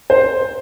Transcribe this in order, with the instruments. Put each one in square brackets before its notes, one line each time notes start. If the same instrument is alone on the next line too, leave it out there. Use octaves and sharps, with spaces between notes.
[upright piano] C5